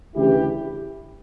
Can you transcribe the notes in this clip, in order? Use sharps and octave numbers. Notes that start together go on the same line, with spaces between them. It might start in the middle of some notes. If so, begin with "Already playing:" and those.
D2 C#3 E3 E4 G4